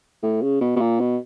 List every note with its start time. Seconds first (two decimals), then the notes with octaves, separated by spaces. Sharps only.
0.23 A2
0.42 C#3
0.61 B2
0.76 B2
0.81 A#2
1.00 B2